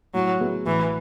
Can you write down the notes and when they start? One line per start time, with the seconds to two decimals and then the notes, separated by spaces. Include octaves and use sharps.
0.14 A2 F#3
0.40 F#3 B3 E4 G#4
0.66 A1 E3